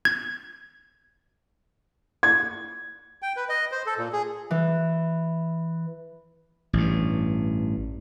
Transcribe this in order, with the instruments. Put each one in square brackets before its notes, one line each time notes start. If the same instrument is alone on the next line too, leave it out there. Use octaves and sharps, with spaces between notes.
[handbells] G#6
[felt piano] G#6
[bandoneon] G5
B4
D#5
C5
A4
A#2
G#4
[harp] E3
[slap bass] A1 G2